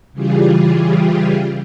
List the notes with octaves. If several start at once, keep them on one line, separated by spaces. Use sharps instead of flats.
C#3 E3 G3 F4 G4 G#4